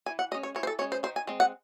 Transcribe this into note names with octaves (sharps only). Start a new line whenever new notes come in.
E3 G#5
F#5
G#3 C#4 D#5
C#5
E3 C#5
C5
A4
G#3 C#4 C#5
C5
D#3 C5
G#5
G#3 C4
F#5